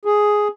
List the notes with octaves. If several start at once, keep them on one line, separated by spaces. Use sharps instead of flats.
G#4